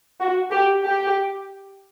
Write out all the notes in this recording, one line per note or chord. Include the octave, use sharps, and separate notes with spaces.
F#4
G4
G4